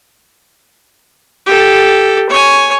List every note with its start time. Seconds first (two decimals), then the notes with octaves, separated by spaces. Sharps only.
1.46 G4 A4
2.29 C#5 G#5